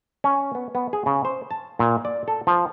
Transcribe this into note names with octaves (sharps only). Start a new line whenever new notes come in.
C#4
B3
B3
G#4
C#3
C5
A5
A#2
D5
A4
F3